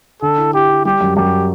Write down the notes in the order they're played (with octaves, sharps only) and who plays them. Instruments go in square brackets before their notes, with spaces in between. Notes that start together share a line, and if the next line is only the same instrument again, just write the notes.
[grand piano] D3 [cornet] A4
[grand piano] E4
[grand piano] E4 [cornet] G4
[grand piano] E4
[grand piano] G3 [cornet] G4
[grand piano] F#2
[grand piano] F#2 [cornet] G4